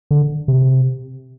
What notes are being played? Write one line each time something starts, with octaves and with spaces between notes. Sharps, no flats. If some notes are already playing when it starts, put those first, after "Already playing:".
D3
C3